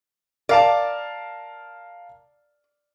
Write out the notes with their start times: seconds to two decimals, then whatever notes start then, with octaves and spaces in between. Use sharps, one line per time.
0.49 A#4 D5 F5 A5